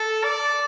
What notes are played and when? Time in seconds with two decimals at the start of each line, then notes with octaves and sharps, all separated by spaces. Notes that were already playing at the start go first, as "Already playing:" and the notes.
Already playing: A4
0.24 D5